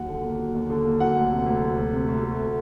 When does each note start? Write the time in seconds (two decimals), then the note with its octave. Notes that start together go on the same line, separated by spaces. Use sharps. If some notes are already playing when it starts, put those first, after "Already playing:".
Already playing: D#2 F#3 F#5
0.08 D3
0.24 A#3
0.39 F#3
0.55 D#2
0.70 D3
0.85 A#3
1.00 F#3 F#5
1.16 D2
1.31 C3
1.46 D2
1.62 F#3
1.77 D2
1.93 C3
2.08 D2
2.23 A3